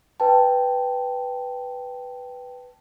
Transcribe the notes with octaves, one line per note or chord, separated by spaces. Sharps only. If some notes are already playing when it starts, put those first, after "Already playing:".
B4 G5 A5